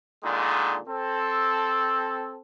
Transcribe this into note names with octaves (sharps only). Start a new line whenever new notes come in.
A#2 D3 D#3 G#3
C4 A4